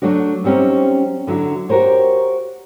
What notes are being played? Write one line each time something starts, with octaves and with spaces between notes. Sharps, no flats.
F#3 A3 D4 F#4
F#3 G3 C4 C#4 D#4
D3 F#3 E4 F#4
F#4 G4 A#4 C5 C#5